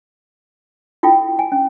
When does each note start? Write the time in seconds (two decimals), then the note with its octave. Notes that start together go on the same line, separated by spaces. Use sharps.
1.03 E4 F4 A4 G5
1.39 G#5
1.52 C#4